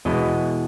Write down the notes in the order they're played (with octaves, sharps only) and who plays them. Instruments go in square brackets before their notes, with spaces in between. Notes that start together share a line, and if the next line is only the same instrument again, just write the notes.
[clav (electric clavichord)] E2 B2 G#3 B3 D#5